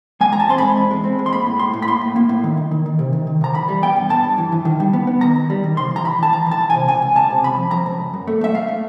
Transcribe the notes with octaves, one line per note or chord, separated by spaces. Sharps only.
G#3 G#5
A#5
E2 A5
C4 C6
G#3 B5
E2
G#3
C4
G#3
C6
A#3 B5
A2
A2 C6
A2
B5
A#3 C6
A2
A#3
A2
D#3
D#3
D#3
D#3
C3
D#3
D#3
C3 A#5
E3 B5
G3
B3 G5
G2
G2 A5
G2
E3
E3
D#3
G3
B3
B3
D#3 A#5
D#3
G3
D#3
C3 C6
E3
A#5
E3 B5
E3 A5
E3 A#5
E3
A5
E3
C3 G#5
C#2 G#5
C#2
C#2 A5
C3
C#2 B5
F3
F3 A#5
C#2
F#2
F#2
A3
A3 E5
A3 F5
A3